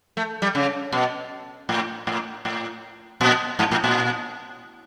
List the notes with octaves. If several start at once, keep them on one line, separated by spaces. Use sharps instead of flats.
A3
G3
C#3
B2
A2
A2
A2
A#2
G#2
A2
A#2